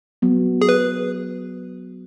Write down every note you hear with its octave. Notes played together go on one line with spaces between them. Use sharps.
F#3 B3
G#4
B4